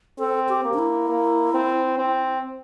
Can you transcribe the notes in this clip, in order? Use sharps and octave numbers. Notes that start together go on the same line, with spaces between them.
C4 A4
G4
A#3
D4
E4
A#3
C4
C4